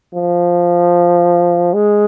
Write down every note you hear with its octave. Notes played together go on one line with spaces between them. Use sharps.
F3
G#3